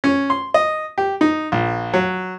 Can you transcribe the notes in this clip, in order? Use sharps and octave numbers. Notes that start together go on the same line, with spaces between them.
C#4
C6
D#5
G4
D#4
A#1
F#3